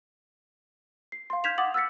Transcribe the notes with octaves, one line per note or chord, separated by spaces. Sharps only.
C7
F5 C6
F6 G6 G#6 B6 E7 F7
F#5 D6 D#6 A6 F#7
E6 F6 A6 B6 C#7